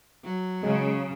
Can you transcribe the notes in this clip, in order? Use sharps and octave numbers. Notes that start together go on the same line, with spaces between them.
F#3
C#3 G#3